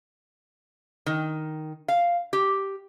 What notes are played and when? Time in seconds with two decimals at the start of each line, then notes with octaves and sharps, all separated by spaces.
1.06 D#3
1.88 F5
2.33 G4